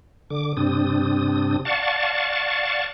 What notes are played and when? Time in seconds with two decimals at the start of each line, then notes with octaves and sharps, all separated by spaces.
0.30 D3 D6
0.57 G2 C3 C4 D4 D#6
1.65 D5 F5 F#5 A5 C#6 A6